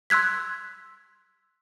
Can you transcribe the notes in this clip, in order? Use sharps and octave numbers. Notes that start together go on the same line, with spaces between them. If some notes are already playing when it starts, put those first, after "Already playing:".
C6 E6 F#6 G#6 B6